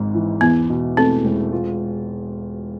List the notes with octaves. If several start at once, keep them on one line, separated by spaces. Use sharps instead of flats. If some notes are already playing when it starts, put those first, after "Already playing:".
Already playing: G#1 G#2
E3
E2 B3
B2
A3 C4
E1
F4